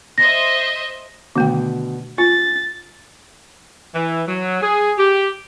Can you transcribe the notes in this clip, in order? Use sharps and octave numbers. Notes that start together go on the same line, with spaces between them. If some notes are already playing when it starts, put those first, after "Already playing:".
C5 D#5 E5 A#6
B2 D3 D#3 A3 G5
F4 G#5 A6
E3
F#3
G#4
G4